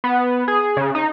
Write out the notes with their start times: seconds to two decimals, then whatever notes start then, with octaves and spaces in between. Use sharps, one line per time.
0.04 B3
0.48 G#4
0.77 C#3
0.95 D#4